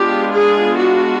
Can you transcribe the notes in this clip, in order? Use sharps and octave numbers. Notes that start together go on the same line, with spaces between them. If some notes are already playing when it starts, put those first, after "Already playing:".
Already playing: G#3 B3 D4 F4 G4
G#4
F#4